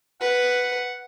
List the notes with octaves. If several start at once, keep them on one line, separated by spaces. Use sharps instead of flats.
B4 F#5